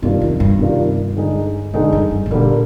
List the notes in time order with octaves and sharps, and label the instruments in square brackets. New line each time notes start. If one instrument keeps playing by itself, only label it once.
[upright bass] G2 [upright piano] C3 D#3 A#3 D4 F4
[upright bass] F2
G2
[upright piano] C3 D#3 A#3 D4 F4
D3 G#3 D#4
[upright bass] F2 [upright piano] D3 G#3 D#4
[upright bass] G2
G2
G#2
[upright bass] A#2 [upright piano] D3 G3 A#3 D4